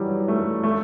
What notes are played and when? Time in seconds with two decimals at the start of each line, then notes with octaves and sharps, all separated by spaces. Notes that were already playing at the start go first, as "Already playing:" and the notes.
Already playing: E3 F#3 G3
0.28 A3
0.63 A3